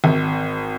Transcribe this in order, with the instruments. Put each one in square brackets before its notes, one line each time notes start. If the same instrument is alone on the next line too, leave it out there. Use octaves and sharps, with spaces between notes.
[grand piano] G#1